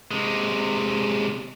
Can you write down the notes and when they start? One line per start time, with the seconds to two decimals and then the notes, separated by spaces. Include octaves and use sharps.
0.11 C3 G#3